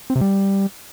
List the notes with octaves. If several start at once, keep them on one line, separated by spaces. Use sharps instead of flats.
C4
C3
G3